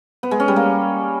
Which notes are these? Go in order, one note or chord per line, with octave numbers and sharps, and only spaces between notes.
B3
G#3
C#4
G3
A#3